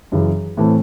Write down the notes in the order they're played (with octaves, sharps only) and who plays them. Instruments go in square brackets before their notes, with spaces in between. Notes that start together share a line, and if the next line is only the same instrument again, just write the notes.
[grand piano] F#2 C#3 E3
A2 E3 A3 C4